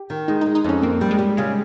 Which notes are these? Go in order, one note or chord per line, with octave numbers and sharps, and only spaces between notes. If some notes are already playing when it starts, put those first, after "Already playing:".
Already playing: G4
D#3
G#3 D#4
D#4
G#3
D#4
F2 C#4
A#3 C4
G3
G#3
G3
C#3 G#3